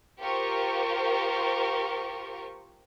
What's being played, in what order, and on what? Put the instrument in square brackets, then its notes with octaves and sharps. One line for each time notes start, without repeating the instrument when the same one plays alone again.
[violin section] F4 G4 A#4 C5 C#6